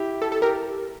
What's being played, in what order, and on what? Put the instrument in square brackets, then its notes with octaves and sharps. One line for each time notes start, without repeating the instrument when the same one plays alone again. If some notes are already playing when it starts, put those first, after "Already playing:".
Already playing: [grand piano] E4 G4
[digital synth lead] A4
A4
[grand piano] G4 [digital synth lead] A#4